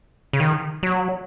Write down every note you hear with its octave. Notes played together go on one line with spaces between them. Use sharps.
C#3
D#3
F#3